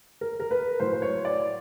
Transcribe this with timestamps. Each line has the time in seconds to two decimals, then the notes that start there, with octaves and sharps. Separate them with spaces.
0.21 A#4
0.40 A#4
0.51 B4
0.80 A2 F#3 C5
0.93 C5
1.02 C#5
1.25 D5